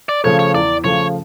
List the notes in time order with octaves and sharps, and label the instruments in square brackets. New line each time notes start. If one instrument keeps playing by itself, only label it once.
[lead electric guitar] D5
[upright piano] C#3 F3 A3 [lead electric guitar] C#5
[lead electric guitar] C#5
[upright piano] E2 [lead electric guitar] D5
[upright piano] C#3 F3 A3 [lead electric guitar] C#5